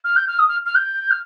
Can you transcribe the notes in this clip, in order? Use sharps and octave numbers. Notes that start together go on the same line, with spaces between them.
F6
G6
F6
D#6
F6
F6
G6
F6